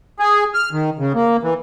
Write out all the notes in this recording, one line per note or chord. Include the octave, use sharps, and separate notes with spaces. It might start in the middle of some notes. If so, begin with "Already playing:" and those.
G#4
F6
D#3
C#3
A#3
E3